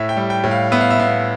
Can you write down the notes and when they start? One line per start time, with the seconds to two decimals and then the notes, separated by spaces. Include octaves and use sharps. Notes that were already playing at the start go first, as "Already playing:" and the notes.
Already playing: A2 E5
0.09 G5
0.17 G3
0.30 G5
0.44 A2
0.51 F5
0.72 B3 E5
0.81 F5
0.90 E5
0.99 B3 F5